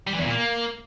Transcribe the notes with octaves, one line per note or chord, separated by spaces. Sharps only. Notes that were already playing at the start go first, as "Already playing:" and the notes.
G3
E3
E2
A#2
A#3